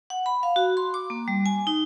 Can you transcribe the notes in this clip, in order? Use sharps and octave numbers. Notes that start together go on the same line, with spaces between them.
F#5
B5
F5
F#4
C6
D6
A#3
G3
G#5
D#4